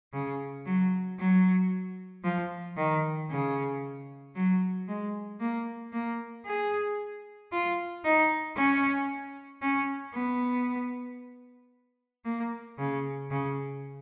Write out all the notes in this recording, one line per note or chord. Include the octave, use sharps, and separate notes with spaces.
C#3
F#3
F#3
F3
D#3
C#3
F#3
G#3
A#3
A#3
G#4
F4
D#4
C#4
C#4
B3
A#3
C#3
C#3